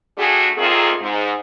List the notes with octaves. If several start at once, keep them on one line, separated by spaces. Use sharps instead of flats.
G3 A3 D4 F#4 G#4
D#3 A3 A#3 C4 F4 G#4
G#2